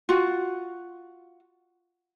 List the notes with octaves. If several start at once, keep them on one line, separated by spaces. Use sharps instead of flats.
F4 F#4